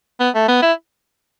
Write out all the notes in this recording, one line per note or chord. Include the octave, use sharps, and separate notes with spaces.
B3
A3
B3
E4